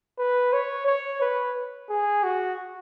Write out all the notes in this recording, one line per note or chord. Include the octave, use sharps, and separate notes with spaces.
B4
C#5
C#5
B4
G#4
F#4